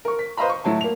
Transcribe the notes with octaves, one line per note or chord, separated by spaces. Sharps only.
A#4 C#6
B6
B4 C5 D#5 F5 A#5 B5
C#6
A2 F#3 E4 A5
A#3 F7